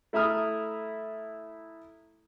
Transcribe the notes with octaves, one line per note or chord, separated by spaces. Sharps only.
A3 E4 E5 A#5 D#6 F6